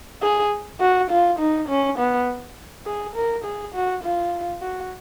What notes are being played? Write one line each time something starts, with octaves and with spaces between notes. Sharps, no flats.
G#4
F#4
F4
D#4
C#4
B3
G#4
A#4
G#4
F#4
F4
F#4